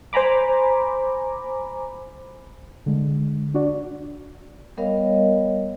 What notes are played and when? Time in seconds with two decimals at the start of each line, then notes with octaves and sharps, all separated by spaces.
0.13 C5 G#5 A#5 B5 D6
2.86 D3 G#3
3.54 D4 F#4 D5
4.77 G3 B3 A#4 C#5 D#5 F5